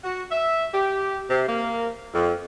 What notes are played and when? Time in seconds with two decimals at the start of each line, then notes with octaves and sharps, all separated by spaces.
0.04 F#4
0.31 E5
0.74 G4
1.30 C3
1.48 A#3
2.14 F2